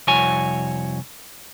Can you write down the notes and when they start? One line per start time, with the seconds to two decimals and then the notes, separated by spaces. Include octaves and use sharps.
0.07 C2 F2 E4 F#4 C#5 G#5